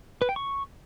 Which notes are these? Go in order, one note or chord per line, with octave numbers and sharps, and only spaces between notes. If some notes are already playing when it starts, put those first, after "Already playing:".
B4
G5
C#6